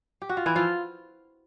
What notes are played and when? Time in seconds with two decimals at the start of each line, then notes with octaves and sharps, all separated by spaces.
0.22 G4
0.29 F#4
0.37 F4
0.46 E3 E4
0.56 F3 F4